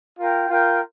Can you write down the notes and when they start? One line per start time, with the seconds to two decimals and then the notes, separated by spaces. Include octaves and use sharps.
0.19 F4 A#4 G5
0.50 F4 A#4 G5